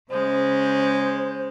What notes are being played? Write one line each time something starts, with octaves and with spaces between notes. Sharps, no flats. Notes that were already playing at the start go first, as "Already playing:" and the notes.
C#3 G#3 C5